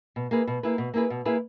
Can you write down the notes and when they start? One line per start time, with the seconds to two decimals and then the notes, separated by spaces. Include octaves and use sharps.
0.16 B2
0.31 A#3 E4 G#4 B4
0.47 B2
0.63 A#3 E4 G#4 B4
0.78 B2
0.94 A#3 E4 G#4 B4
1.10 B2
1.25 A#3 E4 G#4 B4